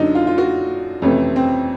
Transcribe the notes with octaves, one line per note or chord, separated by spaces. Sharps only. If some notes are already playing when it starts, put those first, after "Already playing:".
Already playing: F#2 D3 F#3 D4 D#4
F4
F4
F#4
F2 C3 E3 A3 C#4
C4